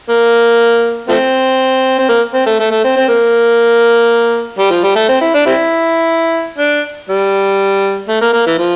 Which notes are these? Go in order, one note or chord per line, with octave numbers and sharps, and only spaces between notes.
A#3
F3 A3 C4
C4
A#3
C4
A3
A3
A3
C4
C4
A#3
G3
F3
G3
A3
C4
E4
D4
G3 C4 E4
D4
G3
A3
A#3
A#3
E3
F3